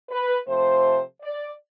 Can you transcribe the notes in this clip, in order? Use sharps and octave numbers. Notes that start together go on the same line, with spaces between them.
B4
C3 F3 A3 C5
D5